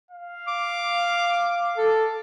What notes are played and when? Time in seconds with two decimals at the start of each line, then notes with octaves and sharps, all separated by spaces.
0.11 F5
0.48 D6
1.77 A4